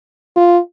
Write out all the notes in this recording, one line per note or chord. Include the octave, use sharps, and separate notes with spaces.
F4